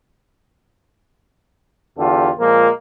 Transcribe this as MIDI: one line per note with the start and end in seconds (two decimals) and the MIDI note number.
1.97 2.29 40
1.97 2.29 50
1.97 2.29 65
1.97 2.29 67
1.97 2.29 69
2.38 2.68 46
2.38 2.68 53
2.38 2.68 56
2.38 2.68 58